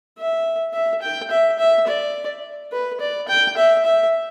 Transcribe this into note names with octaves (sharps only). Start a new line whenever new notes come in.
E5
E5
G5
E5
E5
D5
B4
D5
G5
E5
E5